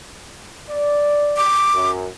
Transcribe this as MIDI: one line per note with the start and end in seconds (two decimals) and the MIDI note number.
0.69 1.45 74
1.37 1.90 86
1.74 2.08 42